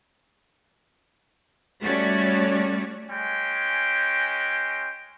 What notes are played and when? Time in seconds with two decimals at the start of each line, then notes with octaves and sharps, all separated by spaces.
1.81 G3 A3 C#4 F#4 C#5 D5
3.10 G#3 C#4 G5